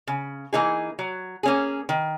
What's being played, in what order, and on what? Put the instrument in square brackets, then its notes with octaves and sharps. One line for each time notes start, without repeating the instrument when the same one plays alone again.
[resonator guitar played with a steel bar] C#3
E3 A#3 D#4 G#4
F#3
A#3 C#4 G#4
D#3